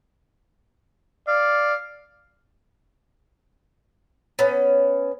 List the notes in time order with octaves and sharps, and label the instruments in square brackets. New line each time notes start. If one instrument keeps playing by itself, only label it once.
[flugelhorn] D5 [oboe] F5
[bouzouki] B3 C#4